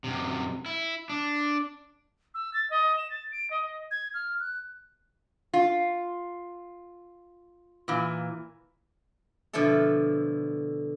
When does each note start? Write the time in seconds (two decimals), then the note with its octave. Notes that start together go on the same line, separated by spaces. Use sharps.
0.04 F#2 C3
0.66 E4
1.10 D4
2.34 E6
2.54 A6
2.70 D#5
2.97 E7
3.10 A6
3.32 D7
3.51 D#5
3.91 G#6
4.14 F6
4.40 F#6
5.53 F4
7.88 A#2 E3
9.53 B2 D3 F3 E4 A4